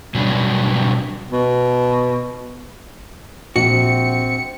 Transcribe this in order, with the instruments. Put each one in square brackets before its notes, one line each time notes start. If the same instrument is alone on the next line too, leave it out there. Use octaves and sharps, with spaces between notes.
[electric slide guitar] B2 F#3 G3 B3 C#4 D4
[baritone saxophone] B2
[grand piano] A#1 [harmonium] C4 [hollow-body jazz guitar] F#4 [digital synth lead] C#7